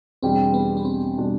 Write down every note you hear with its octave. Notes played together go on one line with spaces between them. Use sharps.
E2 B2 G3 C4 D4 G4
B3
B3
C4
B2 G3 D4 G4